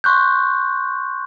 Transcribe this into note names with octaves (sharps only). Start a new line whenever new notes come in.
C6 C#6 F#6 G6